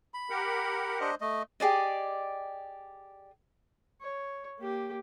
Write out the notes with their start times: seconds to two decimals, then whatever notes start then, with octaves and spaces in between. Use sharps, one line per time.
0.14 B5
0.30 G4 A#4 F#5
1.00 D4 C5 D#5
1.21 A3 D#5
1.60 G4 G#4 D5 D#5
4.01 C#5
4.59 A#3 G4